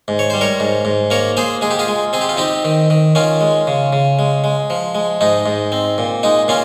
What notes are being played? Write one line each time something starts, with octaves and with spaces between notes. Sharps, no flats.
G#2
C#5
G3 C5
A#4 C#5
G#2
G#2
A#3 A#4 C#5
A#3 G#4 C5
G#3 G#4
G4
F4 G#4
G#3
C4 G#4
G4
F4
C4 D#4 G4
D#3
D#3
D#3 C#4 F4
G#3
C#3
C#3
G#3
G#3
F3
G#3
G#2 D#4
G#2
C4
A#2
G#3 D#4
A#2 C#4 F4